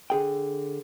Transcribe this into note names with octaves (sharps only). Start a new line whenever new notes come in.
D3 G#4 G5